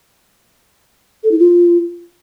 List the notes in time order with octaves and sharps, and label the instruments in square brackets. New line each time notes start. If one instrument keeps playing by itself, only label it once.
[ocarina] A4
E4
F4